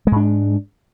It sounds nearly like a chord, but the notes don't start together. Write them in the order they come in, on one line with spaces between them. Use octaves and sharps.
G#3 G#2 D4